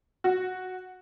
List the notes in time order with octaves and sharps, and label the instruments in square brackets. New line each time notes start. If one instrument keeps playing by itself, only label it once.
[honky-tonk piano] F#4